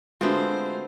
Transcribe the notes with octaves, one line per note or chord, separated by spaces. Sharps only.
D3 G#3 A3 B3 C4 F4 F#4 C5